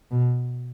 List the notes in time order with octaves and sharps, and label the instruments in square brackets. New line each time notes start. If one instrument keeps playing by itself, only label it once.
[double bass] B2